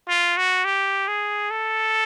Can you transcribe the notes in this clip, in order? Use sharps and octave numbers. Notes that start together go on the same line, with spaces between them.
F4
F#4
G4
G#4
A4